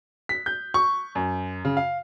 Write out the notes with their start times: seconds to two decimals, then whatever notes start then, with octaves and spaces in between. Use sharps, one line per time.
0.29 B6
0.46 G6
0.74 C#6
1.15 F#2
1.65 C#3
1.77 F5